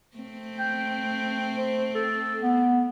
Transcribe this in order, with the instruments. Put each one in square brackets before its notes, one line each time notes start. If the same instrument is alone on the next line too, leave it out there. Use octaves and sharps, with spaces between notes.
[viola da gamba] A3 C4
[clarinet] G5
C5
A4
B3